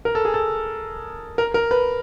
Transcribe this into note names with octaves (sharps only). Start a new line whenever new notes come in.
A#4
A4
G#4
A4
A#4
A#4
B4